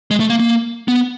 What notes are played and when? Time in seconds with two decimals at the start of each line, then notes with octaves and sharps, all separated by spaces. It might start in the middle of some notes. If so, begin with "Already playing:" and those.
0.11 G#3
0.20 A3
0.30 A#3
0.40 A#3
0.88 B3